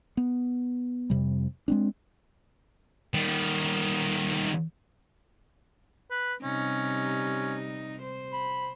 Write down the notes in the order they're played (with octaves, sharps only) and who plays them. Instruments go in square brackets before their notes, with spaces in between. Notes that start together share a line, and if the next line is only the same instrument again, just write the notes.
[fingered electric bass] B3
F2 C3 G3
G#3 C4 D4
[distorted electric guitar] D#3 G3
[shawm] B4
[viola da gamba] C3 G3 D#4 [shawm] C#4
[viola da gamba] C5
[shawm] B5